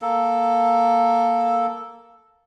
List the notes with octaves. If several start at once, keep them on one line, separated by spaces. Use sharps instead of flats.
A#3 A4